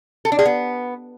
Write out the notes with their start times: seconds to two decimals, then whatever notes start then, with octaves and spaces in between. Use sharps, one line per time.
0.25 A4
0.32 D4
0.39 G#4
0.46 B3